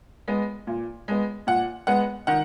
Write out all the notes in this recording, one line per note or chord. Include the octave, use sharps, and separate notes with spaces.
G#3 B3
A#2
G#3 B3
A#2 F#5
G#3 B3 F#5
D#3 F#5